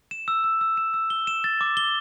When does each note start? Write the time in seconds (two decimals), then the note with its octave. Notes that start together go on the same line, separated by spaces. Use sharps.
0.11 E7
0.28 E6
0.44 E6
0.61 E6
0.77 E7
0.94 E6
1.10 G7
1.27 E7
1.44 A6
1.61 D6
1.77 G7